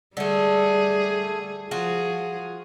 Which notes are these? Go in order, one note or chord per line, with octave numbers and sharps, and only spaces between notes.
D3 G3 A3 G#4
F3 F4 F#4 G#4